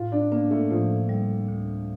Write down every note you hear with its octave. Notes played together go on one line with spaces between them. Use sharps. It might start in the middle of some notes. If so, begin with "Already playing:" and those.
Already playing: A2 F4
D4
A#3 D4
A3
A2 F3
G3
D2